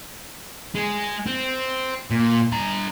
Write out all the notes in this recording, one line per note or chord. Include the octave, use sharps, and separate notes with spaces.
G#3 G#4
C4
A#2
G2 A#5